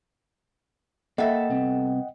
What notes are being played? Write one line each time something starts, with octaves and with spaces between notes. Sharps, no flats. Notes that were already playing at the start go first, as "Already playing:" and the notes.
A#3 A4 D#5 E5 F#5 G5 B5
C2 B3 C4